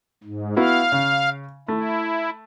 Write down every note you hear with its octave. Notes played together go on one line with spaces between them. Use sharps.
G#2
B3 E4 F#4 F5
C#3
A3 E4